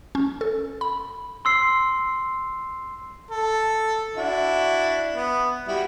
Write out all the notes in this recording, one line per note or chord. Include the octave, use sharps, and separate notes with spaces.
C#4
A4
B5
C6 E6 C7
A4
D4 E4 F#4
B3
G3 E4 F#4